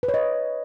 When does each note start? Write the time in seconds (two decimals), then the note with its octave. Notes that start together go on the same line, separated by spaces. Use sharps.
0.03 B4
0.08 C#5
0.14 D#5